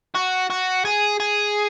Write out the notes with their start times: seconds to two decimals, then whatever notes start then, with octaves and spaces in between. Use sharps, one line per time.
0.15 F#4
0.50 F#4
0.85 G#4
1.20 G#4